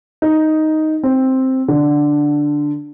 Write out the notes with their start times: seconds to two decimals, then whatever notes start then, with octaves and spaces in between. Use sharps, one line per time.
0.22 D#4
1.03 C4
1.68 D3